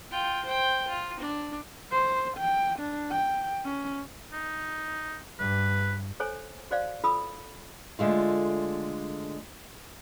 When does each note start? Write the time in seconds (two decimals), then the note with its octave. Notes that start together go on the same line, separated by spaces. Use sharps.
0.11 F4 G5
0.45 C5 G5
0.88 F4
1.19 D4
1.91 C5
2.38 G5
2.79 D4
3.11 G5
3.64 C#4
4.33 D#4
5.39 G2 B4
6.20 A4 C5 C#5 G#5
6.71 F#4 C5 D5 F5
7.04 F4 A4 B5 D#6 E6
7.99 D3 G#3 A3 F4